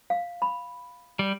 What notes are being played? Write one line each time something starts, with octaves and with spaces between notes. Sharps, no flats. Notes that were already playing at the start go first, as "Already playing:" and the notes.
F5
B5
G3